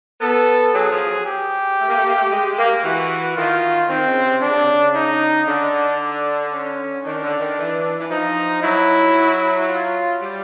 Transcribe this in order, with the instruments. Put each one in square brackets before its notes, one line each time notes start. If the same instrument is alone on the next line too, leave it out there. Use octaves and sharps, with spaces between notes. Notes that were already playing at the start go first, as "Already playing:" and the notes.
[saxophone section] B3 [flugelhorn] A4
[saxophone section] F#3 [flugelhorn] G#4
[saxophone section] F3
F#3
[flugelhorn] G4
[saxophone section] A3
A#3
A3
A#3
A3
G#3
A#3
[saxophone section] E3 [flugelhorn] F#4
[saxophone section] D#3 [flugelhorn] F4
[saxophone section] D#3 [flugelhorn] C4
[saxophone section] C#3
C3
[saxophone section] D3 [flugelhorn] D4
[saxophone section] C#3
C3
C#3
[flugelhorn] D#4
[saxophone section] D3 [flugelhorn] D4
[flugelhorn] D4
C#4
[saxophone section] D#3 [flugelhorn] D4
[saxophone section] D3
D#3
E3
E3
[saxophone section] F3 [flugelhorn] D#4
[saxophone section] F#3 [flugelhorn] E4
[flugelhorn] F4
[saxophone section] G3